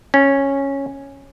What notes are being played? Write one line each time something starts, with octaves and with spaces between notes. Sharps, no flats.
C#4